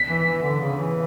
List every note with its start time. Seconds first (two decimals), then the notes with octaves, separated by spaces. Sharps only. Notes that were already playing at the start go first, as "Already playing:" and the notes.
Already playing: B6
0.08 E3
0.26 E3
0.42 D3
0.60 C#3
0.77 E3